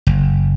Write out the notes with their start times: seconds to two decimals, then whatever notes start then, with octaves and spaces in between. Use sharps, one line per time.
0.07 F#1